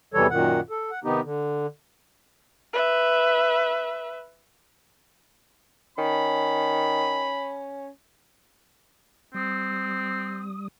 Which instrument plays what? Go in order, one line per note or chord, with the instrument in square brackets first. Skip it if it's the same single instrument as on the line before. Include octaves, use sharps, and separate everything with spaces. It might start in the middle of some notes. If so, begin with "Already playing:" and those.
[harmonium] E2 C3 E3 G3 A4 C#5
F#2 A#2 D#3 F#5
A4
F#5
C3 D#3 B3 D#4 G4
D3
[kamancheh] B4 E5
[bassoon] D#3 [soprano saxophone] C#4 [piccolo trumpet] B5
[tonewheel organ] G3 D#6 [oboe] C4